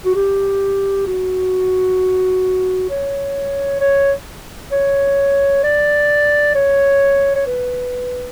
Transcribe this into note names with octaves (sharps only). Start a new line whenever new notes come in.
F#4
G4
F#4
C#5
C#5
C#5
D5
C#5
C#5
B4